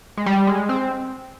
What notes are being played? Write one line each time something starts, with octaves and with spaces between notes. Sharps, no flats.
G#3
G3
G#3
C4